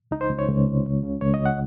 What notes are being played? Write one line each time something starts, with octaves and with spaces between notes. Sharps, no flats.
C#2 D#4
C5
C#2
C#5
C#2
C3
C#2
C#3
C#2 C#5
D#5
C#3
F#5